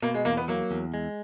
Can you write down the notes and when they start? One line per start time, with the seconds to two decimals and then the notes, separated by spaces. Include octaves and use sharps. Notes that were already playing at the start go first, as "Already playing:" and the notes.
0.02 B2 A#3
0.14 G#3
0.25 E2 A#3
0.37 B3
0.48 F#3 A#3
0.71 E2
0.94 G#3